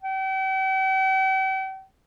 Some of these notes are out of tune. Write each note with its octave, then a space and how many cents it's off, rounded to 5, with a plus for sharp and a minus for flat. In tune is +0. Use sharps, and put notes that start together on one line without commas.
G5 -45